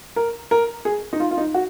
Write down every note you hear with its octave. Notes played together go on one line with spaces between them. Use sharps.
A#4
A#4
G#4
D#4
F4
F4
D#4
F#4